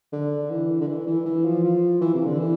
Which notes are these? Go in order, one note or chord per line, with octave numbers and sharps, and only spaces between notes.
D3
E3
D3
E3
E3
E3
F3
F3
E3
C3
D3
E3